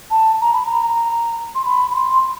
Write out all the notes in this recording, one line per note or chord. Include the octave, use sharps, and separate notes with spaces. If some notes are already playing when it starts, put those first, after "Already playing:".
A5
A#5
B5
A#5
C6
B5
B5
C6